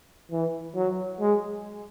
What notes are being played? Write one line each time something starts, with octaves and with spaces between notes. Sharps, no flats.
E3
F#3
G#3